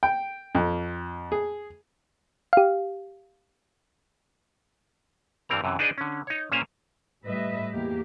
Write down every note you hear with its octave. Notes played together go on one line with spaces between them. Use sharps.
G5
F2
G#4
G4 F5
G2 E3 G3 C4 A#4 A#5
F#2 C3 E3
D4 D#4 G#4 B4 D5 D#5
D3 C#4
D#4 C#5
A#2 A#3 C#4 C5 G#5 A#5
A2 G3 B4 D#5 E5
E2 A#3 G4